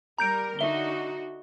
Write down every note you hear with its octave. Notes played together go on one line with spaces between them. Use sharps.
G3 A#4 A#5 G6 D7
D3 D#4 F#4 E5 G7